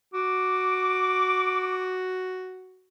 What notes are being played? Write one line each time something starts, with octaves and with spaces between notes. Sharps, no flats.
F#4 D6